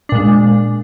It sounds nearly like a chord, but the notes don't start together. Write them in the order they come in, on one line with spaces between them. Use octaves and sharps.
D4 A#2 G#3